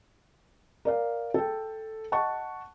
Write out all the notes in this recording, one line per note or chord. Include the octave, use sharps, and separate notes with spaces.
A#4 D5 F5
A4 G5
D#5 F#5 A5 C#6